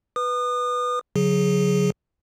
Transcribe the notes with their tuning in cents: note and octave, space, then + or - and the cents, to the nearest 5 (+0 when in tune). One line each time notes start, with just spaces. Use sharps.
B4 +0 D#6 -35
D3 -45 F#3 -15 G#4 +0